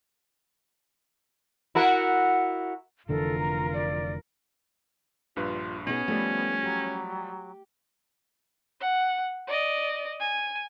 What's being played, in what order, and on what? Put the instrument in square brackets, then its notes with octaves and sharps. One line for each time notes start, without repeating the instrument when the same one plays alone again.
[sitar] E4 F#4 A#4
[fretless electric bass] F1 D3 E3 [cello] F4 A#4 [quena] A4
[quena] A#5
D5
[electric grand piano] A#1 G2 B4 [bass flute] F4
[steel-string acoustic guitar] B2 D#4 G#4 [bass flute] B3 [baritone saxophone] C#4
[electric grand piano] F3 G3 [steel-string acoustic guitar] A3
[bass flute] F#3 [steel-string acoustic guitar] G4
[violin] F#5
D5 D#5
G#5